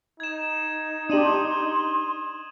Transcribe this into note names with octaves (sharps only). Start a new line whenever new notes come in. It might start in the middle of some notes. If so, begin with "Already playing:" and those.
D#4 G#6 E7
D4 G4 C6 D#6 D#7 F#7